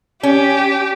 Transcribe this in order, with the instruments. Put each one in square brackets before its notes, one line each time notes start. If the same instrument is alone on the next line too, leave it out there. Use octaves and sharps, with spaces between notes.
[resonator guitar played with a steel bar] C#4 [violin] G4